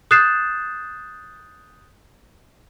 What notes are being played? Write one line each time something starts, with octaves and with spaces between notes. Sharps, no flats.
D#6 F#6 G6 A6 C7 E7